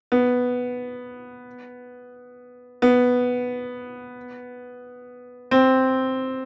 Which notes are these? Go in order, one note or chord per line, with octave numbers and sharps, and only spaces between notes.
B3
B3
C4